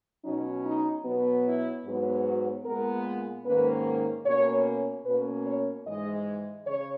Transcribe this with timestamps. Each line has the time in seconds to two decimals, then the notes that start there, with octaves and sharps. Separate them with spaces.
0.24 B2 F#3 C#4 D#4
0.64 D#4
1.05 B2 F#3 B3
1.45 E4
1.85 G#2 F#3 B3
2.25 F#4
2.65 A#2 G#3 B3 A#4
3.45 G#2 D#3 A#3 C#4 B4
4.25 B2 A#3 C#4 C#5
5.06 B2 A#3 C#4 B4
5.47 C#5
5.87 G#2 E3 G#3 D#5
6.67 C#3 C#5